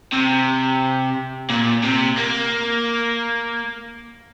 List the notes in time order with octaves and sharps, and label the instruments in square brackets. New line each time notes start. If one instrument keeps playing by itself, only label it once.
[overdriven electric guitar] C3
A#2
C3
A#3